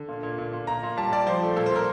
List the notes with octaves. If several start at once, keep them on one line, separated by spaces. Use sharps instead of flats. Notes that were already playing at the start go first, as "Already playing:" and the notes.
Already playing: D3
A#2
A#2
A#2
A#2
A#2 A#5
A#2
G3 A5
G3 D5
F3 C5
A3
A#2 A4
C5
A#2 A#4